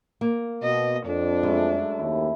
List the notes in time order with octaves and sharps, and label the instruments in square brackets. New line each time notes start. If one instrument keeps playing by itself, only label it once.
[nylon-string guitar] A#3
[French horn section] B2 [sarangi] D#5
[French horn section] F2 [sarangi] D4
[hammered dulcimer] F#2 A3 [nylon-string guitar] G#3
[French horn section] D#2 [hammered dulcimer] E4